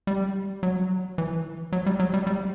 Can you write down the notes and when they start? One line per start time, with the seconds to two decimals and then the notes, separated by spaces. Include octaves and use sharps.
0.07 G3
0.63 F#3
1.18 E3
1.72 F#3
1.86 G3
2.00 F#3
2.14 G3
2.27 G3